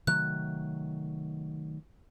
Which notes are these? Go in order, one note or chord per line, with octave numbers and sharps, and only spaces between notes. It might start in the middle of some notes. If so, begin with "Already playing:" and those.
C3 D#3 F#3 A3 F#6